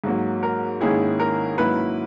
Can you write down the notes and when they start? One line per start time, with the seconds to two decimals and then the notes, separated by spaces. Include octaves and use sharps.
0.04 G#2 F#3 A#3
0.43 A#4
0.81 G#2 D#3 A#3 C#4 E4 G#4
1.20 A#4
1.58 G#2 F#3 A#3 C#4 E4 B4